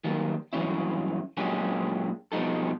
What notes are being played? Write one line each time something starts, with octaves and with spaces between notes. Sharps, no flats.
D#3 F#3 G3 A#3
G2 E3 F#3 C#4 E4
A#2 F#3 G#3 C#4 D4 G4
B2 F3 G3 D#4 A4